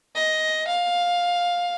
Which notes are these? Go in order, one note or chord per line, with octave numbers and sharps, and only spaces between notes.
D#5
F5